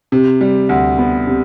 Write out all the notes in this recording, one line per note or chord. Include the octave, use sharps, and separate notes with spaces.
C3
G3
D2
B3
C3